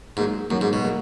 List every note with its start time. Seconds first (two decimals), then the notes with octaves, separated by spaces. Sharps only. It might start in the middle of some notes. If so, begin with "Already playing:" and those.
0.17 G#2 D#3 F#3 A#3
0.50 F#2 D#3 F#3 A#3
0.61 G#2
0.73 B2
0.84 D#3 F#3 A#3